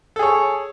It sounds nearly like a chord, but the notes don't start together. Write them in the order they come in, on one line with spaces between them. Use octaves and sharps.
A4 G#4 C#5